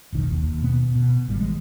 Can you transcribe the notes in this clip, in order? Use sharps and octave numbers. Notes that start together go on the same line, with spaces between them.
F1 B1 D#3
D#2
B2 B3
B2
G#1 D#3 G3
E3 G3 G#3